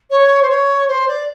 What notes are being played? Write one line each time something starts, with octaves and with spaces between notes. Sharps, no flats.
C#5
C5
C#5
C5
D5